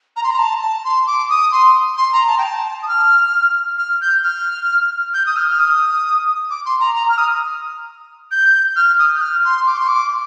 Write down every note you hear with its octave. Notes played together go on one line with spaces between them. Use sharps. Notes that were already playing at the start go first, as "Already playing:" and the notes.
A#5
C6
A#5
A5
A5
C6
D6
D#6
C6
C6
A#5
A5
G5
A5
D#6
F6
F6
G6
F6
G6
D#6
F6
F6
D#6
D6
C6
A#5
A#5
F6
D#6
G6
F6
D#6
G6
F6
C6
D6
C6
D6